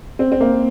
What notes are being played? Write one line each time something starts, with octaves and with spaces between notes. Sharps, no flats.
C4
C4
A#3